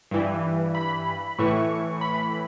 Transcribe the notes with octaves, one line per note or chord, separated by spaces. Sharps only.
G2 E3
B5
A2 E3 C#6
B5